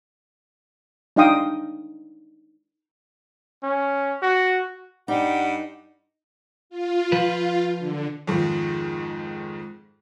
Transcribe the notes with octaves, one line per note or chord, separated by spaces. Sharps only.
D4 D#4 D#5 F5 G5 D#6
C#4
F#4
G2 G3 D#4 F#5
F4
F3 B4
D3
F2 G#2 D#3 F3